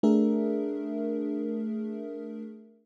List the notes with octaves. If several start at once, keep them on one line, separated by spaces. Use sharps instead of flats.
A3 D4 G#4 A#4 E5